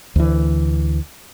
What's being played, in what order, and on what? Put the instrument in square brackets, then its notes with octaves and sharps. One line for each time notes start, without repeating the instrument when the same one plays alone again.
[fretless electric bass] D2 E3